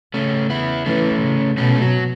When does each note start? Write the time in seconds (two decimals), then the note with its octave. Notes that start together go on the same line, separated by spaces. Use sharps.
0.14 C#3 A3 C#4
0.50 B3 E4
0.86 E3 A3 C#4
1.22 C#3
1.57 B2 A3 C#4
1.75 A3
1.81 F#3